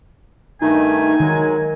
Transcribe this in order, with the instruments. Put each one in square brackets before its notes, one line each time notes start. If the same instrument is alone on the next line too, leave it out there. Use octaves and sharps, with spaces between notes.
[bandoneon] G2 D#3 A3 [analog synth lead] D#4 [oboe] G#5
[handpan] D#3 [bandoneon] F#3 G#3